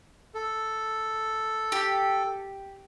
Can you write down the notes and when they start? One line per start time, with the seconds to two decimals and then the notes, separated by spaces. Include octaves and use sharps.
0.35 A4
1.72 G4